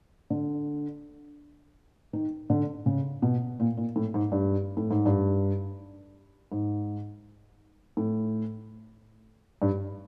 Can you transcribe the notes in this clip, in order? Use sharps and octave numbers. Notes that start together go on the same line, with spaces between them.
D3
D#3
D3
C#3
B2
A#2
A#2
A2
G#2
G2
A2
G#2
G2
G#2
A2
G2